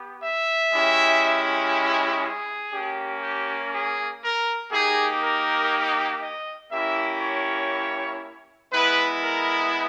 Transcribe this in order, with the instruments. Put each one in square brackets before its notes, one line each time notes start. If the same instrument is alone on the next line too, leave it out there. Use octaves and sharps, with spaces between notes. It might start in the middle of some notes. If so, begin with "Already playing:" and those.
Already playing: [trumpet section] B3 G4
E5
G#3 C#4 E4 G4
G#4
A#3 C#4 G4
G4
G#4
A#4
A#3 D#4 G4 G#4
A#4
D#5
A#3 C#4 E4 G4 E5
C#5
G#3 B3 E4 B4
A#4